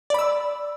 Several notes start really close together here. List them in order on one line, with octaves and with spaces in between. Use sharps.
D5 B5 E6